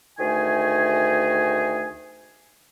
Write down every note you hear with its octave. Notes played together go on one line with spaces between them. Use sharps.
D2 D#3 A3 G#4 G#5